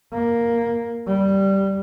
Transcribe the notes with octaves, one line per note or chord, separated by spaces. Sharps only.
A#3
G3